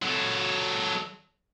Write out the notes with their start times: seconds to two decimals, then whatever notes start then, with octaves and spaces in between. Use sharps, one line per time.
0.02 F#3 A4